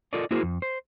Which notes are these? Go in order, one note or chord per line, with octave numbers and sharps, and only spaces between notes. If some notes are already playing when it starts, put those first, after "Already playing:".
F4 A4 A#4 D5 D#5
A#3 E4 F#4 G#4 A#4 C5
F2
C5